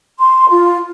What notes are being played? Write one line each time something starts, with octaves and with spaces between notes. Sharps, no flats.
C6
F4